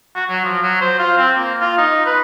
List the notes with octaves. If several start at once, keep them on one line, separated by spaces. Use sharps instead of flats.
F#4
F#3
F3
F#3
C5
F4
C4
A#3
F4
D#4
B4